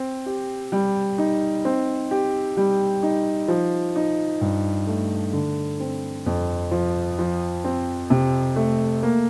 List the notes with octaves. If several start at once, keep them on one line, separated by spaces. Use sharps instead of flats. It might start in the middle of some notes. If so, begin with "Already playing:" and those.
Already playing: C4
G4
G3
D#4
C4
G4
G3
D#4
F3
D#4
G2
A3
D3
C4
F2
F3
F3
C4
C3
A3
A#3